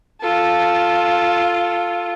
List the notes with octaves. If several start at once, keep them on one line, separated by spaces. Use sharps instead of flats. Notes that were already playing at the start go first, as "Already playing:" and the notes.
F4 A4